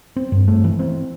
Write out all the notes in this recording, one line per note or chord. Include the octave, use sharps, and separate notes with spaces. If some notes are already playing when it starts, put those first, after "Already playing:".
C4
G2
A3
E3
C4